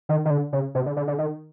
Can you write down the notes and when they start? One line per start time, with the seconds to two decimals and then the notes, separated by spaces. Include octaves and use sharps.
0.09 D#3
0.25 D#3
0.30 D3
0.53 C#3
0.75 C3
0.86 D3
0.97 D3
1.08 D3
1.18 D#3